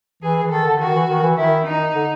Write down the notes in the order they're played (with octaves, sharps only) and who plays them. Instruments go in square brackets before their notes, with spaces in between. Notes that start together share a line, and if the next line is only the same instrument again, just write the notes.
[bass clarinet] E3 [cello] G#4
[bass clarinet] E3
[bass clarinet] D#3 [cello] A4
[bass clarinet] D3
[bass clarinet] D#3 [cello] F#4
[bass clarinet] E3
D#3
E3
[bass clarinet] D#3 [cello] E4
[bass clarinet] D#3 [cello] D#4
[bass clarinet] D3